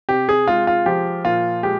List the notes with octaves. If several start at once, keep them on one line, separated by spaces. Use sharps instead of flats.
C3 G4
G#4
G#3 F4
F4
F3 G4
A#2 F4
G#3 G4